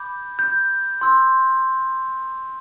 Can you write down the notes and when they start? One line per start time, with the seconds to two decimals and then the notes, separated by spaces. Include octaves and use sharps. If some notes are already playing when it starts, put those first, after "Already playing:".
Already playing: B5 D6 G6
0.39 G6
1.01 C6 E6 G6